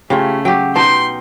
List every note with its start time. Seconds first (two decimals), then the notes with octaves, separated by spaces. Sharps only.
0.10 C#3 A3 F4 G4 C#5
0.45 F#3 G4 G5
0.76 B2 D#4 G5 A5 C6